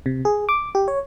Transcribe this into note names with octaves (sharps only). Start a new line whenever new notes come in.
C3
G#4
D6
G4
C#5